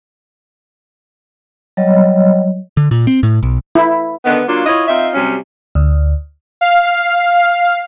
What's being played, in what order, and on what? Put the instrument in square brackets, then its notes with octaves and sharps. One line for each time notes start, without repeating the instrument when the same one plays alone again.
[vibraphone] F#3 G3 C#5 D#5
[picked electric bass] D3
A#2
C4
A2
B1
[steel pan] E4
[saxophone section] D3 D#3 B3
F#3 A#3 D4 F4
E4 F4 C#5 D#5
C4 D#4 F4 E5
C3 F#3 G3 C#4
[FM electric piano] D2
[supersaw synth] F5